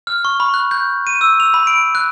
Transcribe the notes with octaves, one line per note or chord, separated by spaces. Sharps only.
F6
C#6
B5
F#6
G6
D#7
E6
F7
B5
D7
F#6